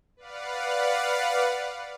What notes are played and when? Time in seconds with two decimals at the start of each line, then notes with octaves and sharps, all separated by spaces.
0.17 B4 D5 F5 F#5